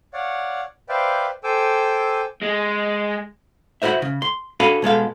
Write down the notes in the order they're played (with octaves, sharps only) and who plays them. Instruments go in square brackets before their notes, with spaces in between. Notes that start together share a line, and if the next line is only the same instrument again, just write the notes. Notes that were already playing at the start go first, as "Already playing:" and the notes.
[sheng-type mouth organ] C#5 D5 F5 F#5
B4 C5 D5 E5 F5 G5
A4 C5 G5 G#5 D6 E6
[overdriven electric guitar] G#3
[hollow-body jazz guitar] E4 F#4 A#4 C5 E5
C#3
C6
D4 F#4 A4 F5 G#5 B5
B2 G#3 A4 F5